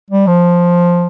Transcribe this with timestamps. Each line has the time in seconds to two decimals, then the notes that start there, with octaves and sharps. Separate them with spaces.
0.10 G3
0.27 F3